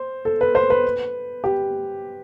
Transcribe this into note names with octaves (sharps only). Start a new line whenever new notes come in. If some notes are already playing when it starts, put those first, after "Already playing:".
Already playing: C5
A4
B4
C5
B4
G4